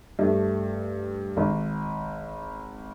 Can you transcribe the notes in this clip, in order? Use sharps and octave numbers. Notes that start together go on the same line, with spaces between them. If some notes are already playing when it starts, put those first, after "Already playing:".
G2 A3
G#1